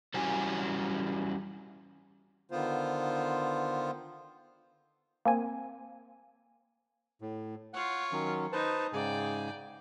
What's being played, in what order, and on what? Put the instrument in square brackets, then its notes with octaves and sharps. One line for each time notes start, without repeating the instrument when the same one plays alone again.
[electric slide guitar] E3 G3 C#4 F#4 G#5
[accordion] D3 D#3 B3 F4 C5
[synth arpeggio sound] A#3 C4 G#5
[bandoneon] A2
[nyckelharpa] F4 C#5 [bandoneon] F#5
[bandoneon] D#3 F#3 C#4
[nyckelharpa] D#4 [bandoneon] B4 C5 A5
[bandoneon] G#2 C#3 G#5 [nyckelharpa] D5 G5